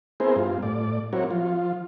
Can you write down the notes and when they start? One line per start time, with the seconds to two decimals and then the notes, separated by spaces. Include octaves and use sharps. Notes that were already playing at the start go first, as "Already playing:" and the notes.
0.20 B3 C4 E4 G#4 A#4 C5
0.36 G2 F4
0.62 A2 D5
1.13 F#3 C4 E4 F#4 A#4 C#5
1.31 F3 F4